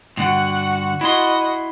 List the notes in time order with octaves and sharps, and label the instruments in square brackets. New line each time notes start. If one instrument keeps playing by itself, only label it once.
[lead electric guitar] G2 D3 [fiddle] F#4 F#5
[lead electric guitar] E4 C6 [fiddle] F#4 D#5